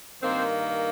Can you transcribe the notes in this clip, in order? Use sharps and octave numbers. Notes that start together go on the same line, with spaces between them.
G2 D#3 A#3 C4 C5